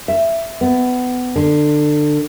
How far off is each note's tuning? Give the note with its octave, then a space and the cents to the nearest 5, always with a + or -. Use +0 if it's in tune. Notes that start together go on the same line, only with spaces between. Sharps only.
E5 +10
B3 +20
D3 +25